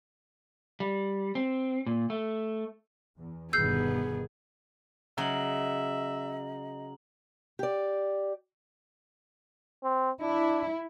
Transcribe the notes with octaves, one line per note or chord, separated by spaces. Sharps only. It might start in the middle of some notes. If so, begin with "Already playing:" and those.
G3
C4
A#2
A3
E2
G1 B2 D#3 B3 G#4 E6 G6 C7
C#3 F#3 C#4 D#5 E5 A#5 F#7
G4 D5
C4
D4 E4